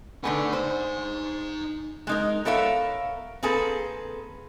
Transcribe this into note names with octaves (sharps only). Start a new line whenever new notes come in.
D3 A3 B3 D#4 G#5
C5
G#3 D#4 A#4
B3 A4 A#4 C#5 E5 F5
A#3 C4 G#4 A4 B4